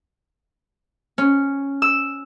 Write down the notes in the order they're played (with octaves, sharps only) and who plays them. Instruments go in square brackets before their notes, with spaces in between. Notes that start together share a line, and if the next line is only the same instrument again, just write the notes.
[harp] C#4
E6